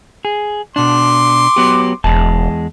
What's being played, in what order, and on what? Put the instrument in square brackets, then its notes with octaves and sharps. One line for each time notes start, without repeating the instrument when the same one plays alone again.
[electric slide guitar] G#4
[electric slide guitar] B2 D4 [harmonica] C6 D6
[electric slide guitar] F#3 B3 G4
[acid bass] E1 [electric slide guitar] E2 G#3 A5